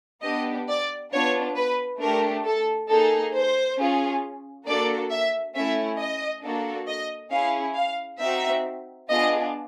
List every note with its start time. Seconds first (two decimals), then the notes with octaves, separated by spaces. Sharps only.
0.23 B3 D4 G4 D#5
0.69 D5
1.13 B3 D4 F4 C#5
1.56 B4
2.01 A3 D4 G4 A#4
2.46 A4
2.89 A#3 D#4 G#4 A4
3.34 C5
3.78 C#4 F4 G#4
4.66 A#3 D4 F#4 A4 D5
5.11 E5
5.55 A3 C#4 E4 E5
5.99 D#5
6.43 A#3 D4 F#4 A4
6.88 D#5
7.32 C#4 E4 G#4 F5
7.76 F5
8.21 C4 D#4 F#4 E5
9.09 B3 D4 F4 G#4 D#5